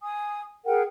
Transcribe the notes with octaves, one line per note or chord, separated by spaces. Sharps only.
G#5 D#6
G#4 A#4 F#5 G5